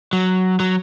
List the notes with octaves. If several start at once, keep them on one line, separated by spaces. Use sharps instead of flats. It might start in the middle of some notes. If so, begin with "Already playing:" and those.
F#3
F#3